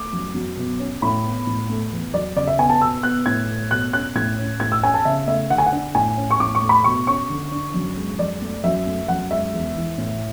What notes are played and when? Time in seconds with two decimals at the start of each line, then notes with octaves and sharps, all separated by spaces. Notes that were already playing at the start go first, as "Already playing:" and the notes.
Already playing: A3 D6
0.13 F#2
0.35 F#3
0.57 B2
0.79 C#4
1.02 A2 B5
1.25 B3
1.47 A2
1.69 A3
1.92 E2
2.14 F#3 D5
2.36 C#3 D5
2.47 E5
2.58 B3 G#5
2.70 A5
2.81 B2 E6
3.03 B3 F#6
3.26 A2 G#6
3.48 A3
3.71 B2 F#6
3.93 C#4 F#6
4.15 A2 G#6
4.39 C#4
4.60 A2 G#6
4.72 E6
4.83 C#4 G#5
4.94 A5
5.05 C#3 E5
5.27 A3 E5
5.50 D3 F#5
5.58 G#5
5.66 F#5
5.72 D4
5.95 A2 G#5
6.17 C#4
6.31 C#6
6.40 A2 D6
6.55 C#6
6.62 A3
6.69 B5
6.84 B2 C#6
7.07 C#4 C#6
7.30 D3
7.52 D4
7.74 F#2
7.97 G#3
8.19 F#2 D5
8.42 A3
8.64 F#2 E5
8.87 A3
9.08 F#2 F#5
9.31 G#3 E5
9.53 E2
9.76 E3
9.98 A2